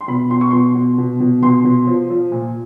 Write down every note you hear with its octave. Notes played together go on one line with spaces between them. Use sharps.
C6
B2 B5
B2 C6
C#6
B2 C6
B2
B2
B2
B2 C6
B2
F3
F3
A#2